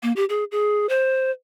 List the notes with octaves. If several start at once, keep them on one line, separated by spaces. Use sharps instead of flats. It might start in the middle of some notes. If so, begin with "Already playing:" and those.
A#3
G4
G#4
G#4
C5